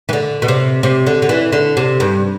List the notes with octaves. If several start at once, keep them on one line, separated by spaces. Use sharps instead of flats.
E3
D3
B2
C3
C3
D3
D3
E3
D3
C3
G2